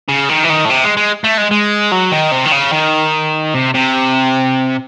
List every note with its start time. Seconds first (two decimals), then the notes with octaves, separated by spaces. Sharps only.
0.09 C#3
0.29 D#3
0.44 E3
0.50 D#3
0.65 A2
0.70 C3
0.84 G#3
0.97 G#3
1.24 A3
1.38 G#3
1.51 G#3
1.92 F#3
2.12 D#3
2.32 C3
2.46 D#3
2.52 C#3
2.73 D#3
3.54 C3
3.74 C3